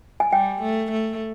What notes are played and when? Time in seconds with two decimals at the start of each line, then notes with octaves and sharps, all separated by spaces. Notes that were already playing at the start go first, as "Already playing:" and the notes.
0.20 G#5
0.32 G3 G5
0.62 A3
0.91 A3